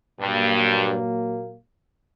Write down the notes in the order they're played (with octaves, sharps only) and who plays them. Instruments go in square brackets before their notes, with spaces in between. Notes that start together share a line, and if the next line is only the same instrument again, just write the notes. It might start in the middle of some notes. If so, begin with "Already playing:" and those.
[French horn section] G2 [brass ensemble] A#2 F#3 A#3